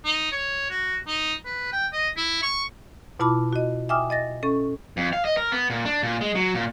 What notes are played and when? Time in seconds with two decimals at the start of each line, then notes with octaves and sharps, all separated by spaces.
0.05 D#4
0.32 C#5
0.70 F#4
1.08 D#4
1.45 B4
1.73 G5
1.93 D#5
2.17 E4
2.42 C#6
3.20 B2 E4 F4 A5 B5 D6
3.53 F#4 D#5
3.89 E5 G5 G#5 D6 D#6 F6
4.10 D#5 A6 A#6
4.43 C#4 A4 C#6
4.97 F2
5.13 F5
5.25 D#5
5.37 A#4
5.52 B3
5.70 A#2
5.86 D4
6.03 A#2
6.21 G#3
6.35 F#3
6.55 A#2